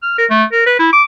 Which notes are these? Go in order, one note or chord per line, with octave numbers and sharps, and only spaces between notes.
F6
A#4
A3
A#4
B4
E4
D6